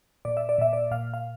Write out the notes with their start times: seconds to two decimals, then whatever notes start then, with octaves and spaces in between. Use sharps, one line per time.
0.25 A#2 D5
0.37 E5
0.49 D5
0.58 A#2 E5
0.73 D5
0.91 A#2 F5
1.14 F5